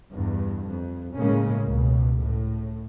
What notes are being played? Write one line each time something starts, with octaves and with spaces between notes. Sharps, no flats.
E2 G2
F2
A2 C#3 G#3 A#3 C#4
C#2 B2
A2